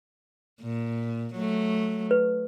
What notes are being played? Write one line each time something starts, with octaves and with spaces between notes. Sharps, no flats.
A#2
F#3 A3
B4